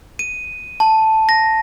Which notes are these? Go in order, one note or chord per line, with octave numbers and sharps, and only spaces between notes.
D#7
A5
A#6